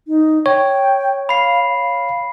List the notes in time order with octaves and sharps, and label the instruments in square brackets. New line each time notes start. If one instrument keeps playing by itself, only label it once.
[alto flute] D#4
[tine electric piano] C#5 [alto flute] G5
[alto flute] F5 [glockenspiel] B5 C7
[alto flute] F5